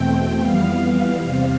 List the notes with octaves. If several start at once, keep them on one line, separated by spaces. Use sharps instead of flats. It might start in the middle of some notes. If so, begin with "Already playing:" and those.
Already playing: E2 B2 A3 C4 G5
F2 E3 G3 B3 F5
E2 C3 G3 C4